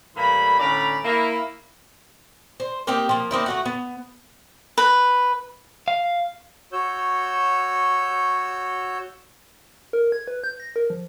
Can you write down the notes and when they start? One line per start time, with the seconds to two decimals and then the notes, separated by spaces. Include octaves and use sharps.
0.17 A2 E3 G3 A#3 B5
0.59 A2 D3 C#4 D5 A#5 B5
1.04 A#3 E4 A#4
2.60 C5
2.87 A#3 C4 D#4 G4
3.09 F3 A#3
3.31 A#3 C4 D#4 E4
3.46 A3 F#4 F#5
3.66 B3
4.78 B4
5.88 F5
6.73 F#4 C#5 E6 G6
9.93 A#4
10.12 G#6
10.28 B4
10.44 G6
10.60 A#6
10.76 A#4
10.90 F3